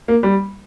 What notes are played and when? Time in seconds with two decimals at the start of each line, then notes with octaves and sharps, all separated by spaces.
0.08 A#3
0.23 G3